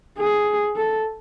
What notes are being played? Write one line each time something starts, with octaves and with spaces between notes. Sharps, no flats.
G#4
A4